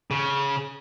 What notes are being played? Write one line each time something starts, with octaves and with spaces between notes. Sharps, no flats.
C#3